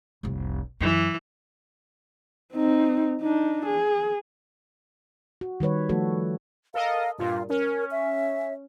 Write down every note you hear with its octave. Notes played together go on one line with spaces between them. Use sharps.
F1 C2
F#2 E3
C4 D#4
D4 D#4
G#4
F#4
D#3 G3 B4 C#5
F3 A3 F#4 A4
A4 A#4 D#5 F5
G2 A#2 F4
C#4 A#4
E5